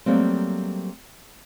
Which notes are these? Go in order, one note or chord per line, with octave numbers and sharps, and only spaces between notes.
F#3 G3 A3 A#3 C4